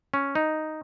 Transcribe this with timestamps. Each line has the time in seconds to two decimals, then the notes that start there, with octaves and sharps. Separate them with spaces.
0.14 C#4
0.35 D#4